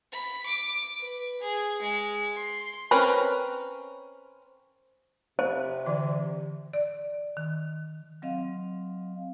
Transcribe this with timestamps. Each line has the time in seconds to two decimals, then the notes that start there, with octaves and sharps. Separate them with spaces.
0.12 B5
0.46 D6
0.99 B4
1.41 G#4
1.82 G#3
2.36 C6
2.91 C4 C#4 A#4 B4
5.39 C3 C5
5.86 D3 E3 D5
6.73 D5
7.37 D#3
8.22 F#3 C4 D#5 F5